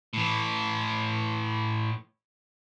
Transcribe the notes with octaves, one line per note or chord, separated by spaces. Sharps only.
A2 E3